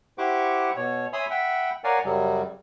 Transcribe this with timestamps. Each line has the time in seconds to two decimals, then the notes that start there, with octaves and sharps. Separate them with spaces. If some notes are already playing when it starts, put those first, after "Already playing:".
0.18 E4 G4 C5 F#5 C#6 D6
0.76 B2 C#5
1.13 C#5 E5 G#5 B5 C6 D#6
1.30 E5 F#5 G5 B5
1.84 A#4 C#5 D5 F5 F#5 G#5
2.04 F#2 C#3 F#3 G3